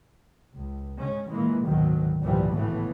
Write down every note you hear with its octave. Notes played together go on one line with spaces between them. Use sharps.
C#2
C#3 G#3 C#4
A#2 E3 G#3 A#3
D2 G#2 B2 D#3 F#3
G#1 C#2 A#2 E3 F3 G3
A2 C#3 E3 A3 B3